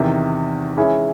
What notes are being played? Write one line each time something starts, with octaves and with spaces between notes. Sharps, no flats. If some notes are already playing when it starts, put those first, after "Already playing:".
Already playing: E2 C3 D#3
E3 G#3 C#4 E4 G#4